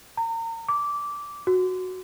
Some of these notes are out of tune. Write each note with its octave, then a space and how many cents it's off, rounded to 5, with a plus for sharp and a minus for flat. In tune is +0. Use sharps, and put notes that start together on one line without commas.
A#5 -35
D6 -15
F#4 -10